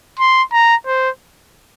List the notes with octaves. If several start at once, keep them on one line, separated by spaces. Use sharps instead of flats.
C6
A#5
C5